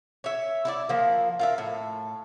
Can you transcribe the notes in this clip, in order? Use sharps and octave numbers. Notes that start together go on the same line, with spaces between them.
C#5 E5
E4 F4 D5
F3 A#3
F4 A#4 E5
A2